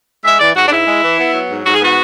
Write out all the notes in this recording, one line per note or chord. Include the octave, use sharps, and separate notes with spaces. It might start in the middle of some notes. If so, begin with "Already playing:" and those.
G#3 E5
E3 D5
G#2 F#4
D4
G#2 E4
G#3
E3
B3
F#3
G#2
G#2 F#4
G#4
B3 F#4